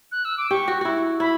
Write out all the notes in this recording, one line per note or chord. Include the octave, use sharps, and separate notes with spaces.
F#6
E6
D6
G4 C#6
F#4
E4 F#4
E4 B5